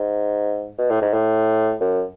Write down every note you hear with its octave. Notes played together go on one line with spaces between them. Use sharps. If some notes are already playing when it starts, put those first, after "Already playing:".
Already playing: G#2
B2
A2
G#2
A2
F#2